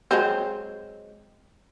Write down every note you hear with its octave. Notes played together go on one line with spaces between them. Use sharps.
F#3 G#3 C4